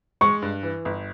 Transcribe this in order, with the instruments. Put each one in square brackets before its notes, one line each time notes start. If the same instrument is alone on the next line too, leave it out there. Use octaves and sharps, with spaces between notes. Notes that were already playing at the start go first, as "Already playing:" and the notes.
[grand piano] G#3 [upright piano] C#6
[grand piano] G2
E3
G1